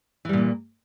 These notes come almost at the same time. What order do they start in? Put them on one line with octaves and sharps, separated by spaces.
E3 G3 A#2 A#3